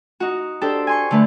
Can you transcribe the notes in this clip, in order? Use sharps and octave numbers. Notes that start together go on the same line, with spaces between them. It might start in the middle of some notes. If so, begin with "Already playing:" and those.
D#4 F#4
D4 G4 A4 C5
G#5 C6 C#6
D3 A3 B4